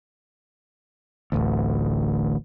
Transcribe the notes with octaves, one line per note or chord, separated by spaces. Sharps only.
D1 A1 D2